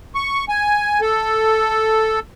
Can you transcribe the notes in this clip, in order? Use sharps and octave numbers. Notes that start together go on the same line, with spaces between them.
C#6
G#5
A4